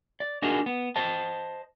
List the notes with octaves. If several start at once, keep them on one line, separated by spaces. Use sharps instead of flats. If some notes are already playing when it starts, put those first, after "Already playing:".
D5
D4 D#4 F#4 G#4 A#4 D#5
B3
C5 D#5 A5